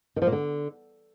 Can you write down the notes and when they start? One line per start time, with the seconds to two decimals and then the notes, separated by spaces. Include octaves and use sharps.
0.16 D#3
0.22 F3
0.27 A#2
0.32 D3